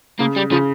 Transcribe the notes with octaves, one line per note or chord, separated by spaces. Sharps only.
C#3 A#3
G3
C#3 F3